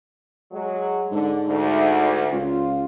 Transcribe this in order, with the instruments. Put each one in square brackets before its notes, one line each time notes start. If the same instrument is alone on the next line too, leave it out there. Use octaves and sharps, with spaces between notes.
[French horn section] F#3 G#3
[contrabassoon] G#2 [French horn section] D3
[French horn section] D2
[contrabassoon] C#2 [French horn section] F4